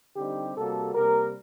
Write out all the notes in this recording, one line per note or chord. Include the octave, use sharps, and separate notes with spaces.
D3 G3 C4 D#4 G4
C3 G3 A#3 F#4 A4
C3 G3 A#3 G4 A#4